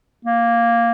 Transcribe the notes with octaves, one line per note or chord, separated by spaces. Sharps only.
A#3